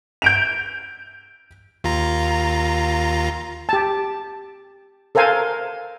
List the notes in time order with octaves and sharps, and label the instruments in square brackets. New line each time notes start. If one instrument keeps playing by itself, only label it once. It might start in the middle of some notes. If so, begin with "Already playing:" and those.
[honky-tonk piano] G6 D7 F7
[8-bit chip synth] D#2 F4 A#5
[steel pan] G4 A5
A4 A#4 C5 F5 G#5